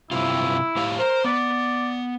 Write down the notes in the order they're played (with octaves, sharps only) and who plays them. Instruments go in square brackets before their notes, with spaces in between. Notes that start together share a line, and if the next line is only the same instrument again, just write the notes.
[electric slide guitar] G2 C3 F4 [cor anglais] E4
[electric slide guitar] A2 G4 F5
[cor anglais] A#4 [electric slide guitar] C5
[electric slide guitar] B3 [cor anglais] D5